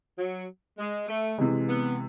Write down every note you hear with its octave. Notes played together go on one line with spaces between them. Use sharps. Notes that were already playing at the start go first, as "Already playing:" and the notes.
F#3
G#3
A3
C3 E3 G#3
B3